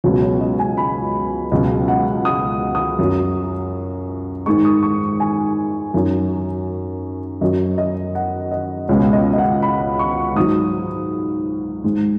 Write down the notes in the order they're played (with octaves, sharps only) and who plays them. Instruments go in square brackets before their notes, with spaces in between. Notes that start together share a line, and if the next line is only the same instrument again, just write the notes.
[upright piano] C#2 B2 F#3 C#5
C#5
D#5
G#5
B5
C#2 B2 F#3 D#5
F#5
D#6
D#6
F#2 F#3
G#2 D#3 G#3 C#6
D#6
C#6
G#5
F#2 D#3 F#3
F#2 F#3 D#5
D#5
F#5
D#5
C#2 B2 G#3 C#5
D#5
D#5
F#5
B5
C#6
G#2 F#3 D#6
G#2 G#3